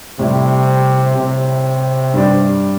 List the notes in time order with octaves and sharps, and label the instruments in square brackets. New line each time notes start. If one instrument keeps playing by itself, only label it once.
[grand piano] A2 G3 E4 [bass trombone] C3
[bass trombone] C3
[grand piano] G2 G3 D4